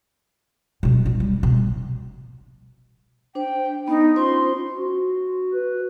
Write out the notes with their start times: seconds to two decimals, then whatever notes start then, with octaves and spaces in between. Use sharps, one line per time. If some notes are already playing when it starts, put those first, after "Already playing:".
0.83 B2 F#3
1.06 F4
1.20 G3
1.43 B2
3.35 D4 C5 G5
3.88 B3 D#4
4.16 C#4 F4 C5 C6
4.76 F#4
5.53 B4